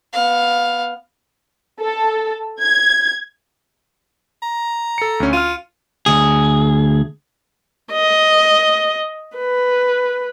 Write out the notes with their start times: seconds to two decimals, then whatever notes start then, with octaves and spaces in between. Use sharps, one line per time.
0.13 B3 F5
1.80 A4
2.61 G#6
4.42 A#5
4.98 A4 C#7
5.20 D2 C#4
5.33 F4 F6 D#7
6.06 D2 G#4
7.93 D#5
9.37 B4